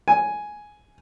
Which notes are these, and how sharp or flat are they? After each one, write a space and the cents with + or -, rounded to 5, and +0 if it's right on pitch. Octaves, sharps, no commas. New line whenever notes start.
G#5 +5